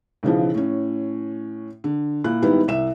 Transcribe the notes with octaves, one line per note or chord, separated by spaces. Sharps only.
B1 C#3 E3 F3
A2 C#4
D3
A#2 E4 F#6
G#2 D#3 G3 B3 E4
C2 E5 E7